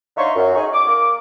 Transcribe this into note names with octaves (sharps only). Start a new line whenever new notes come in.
D3 D#4 E5 F5 C6 C#6
F#2
D#4 G#4 C#6
D6
A#3 D6